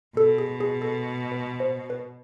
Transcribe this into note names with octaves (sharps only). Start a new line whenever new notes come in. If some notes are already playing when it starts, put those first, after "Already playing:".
B2 A4
G#4
G#4
A4
B4
C5
B4